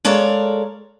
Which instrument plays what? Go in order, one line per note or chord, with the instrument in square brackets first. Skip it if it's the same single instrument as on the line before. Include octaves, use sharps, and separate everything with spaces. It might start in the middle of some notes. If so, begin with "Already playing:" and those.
[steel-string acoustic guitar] G#3 A4 A#4 C#5 D5 F5